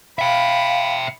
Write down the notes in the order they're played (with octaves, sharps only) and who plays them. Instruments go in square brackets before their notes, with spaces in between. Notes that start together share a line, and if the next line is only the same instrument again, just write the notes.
[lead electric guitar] E5 G5 [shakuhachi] F5 [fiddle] B5